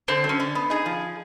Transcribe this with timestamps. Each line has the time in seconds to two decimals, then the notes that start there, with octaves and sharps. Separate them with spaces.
0.08 D3 C4
0.24 F#3
0.29 C#4
0.40 D3
0.55 B3
0.70 D#4 G#4
0.86 F3